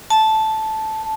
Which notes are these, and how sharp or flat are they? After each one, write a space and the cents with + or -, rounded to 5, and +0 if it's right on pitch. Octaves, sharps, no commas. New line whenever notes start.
A5 -5